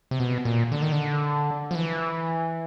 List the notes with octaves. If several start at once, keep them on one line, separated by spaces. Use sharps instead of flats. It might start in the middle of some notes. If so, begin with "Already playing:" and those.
C3
B2
A#2
D3
D#3
D3
F3
E3